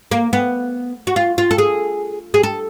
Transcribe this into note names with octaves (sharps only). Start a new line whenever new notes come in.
A#3
B3
F#4
F4
F4
A4
G#4
G#4
A4